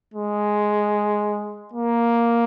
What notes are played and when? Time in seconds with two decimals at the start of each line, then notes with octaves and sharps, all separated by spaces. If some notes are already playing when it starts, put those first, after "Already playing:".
0.14 G#3
1.74 A#3